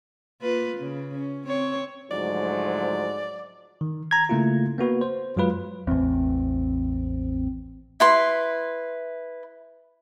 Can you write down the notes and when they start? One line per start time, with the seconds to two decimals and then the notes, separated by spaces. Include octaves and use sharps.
0.41 A#3 F4 B4
0.77 C#3
1.15 C#4
1.47 C4 C#5
2.11 D2 G#2 F3 F#3 D5
3.81 D#3
4.11 A#5 G#6
4.29 C#3 A3 A#3 E4 F4
4.78 A#3 B3 F#4 B4
5.01 C5
5.36 F#2 F#3 G#3 F4 B4
5.87 A1 E2 C4
8.00 E4 B4 C6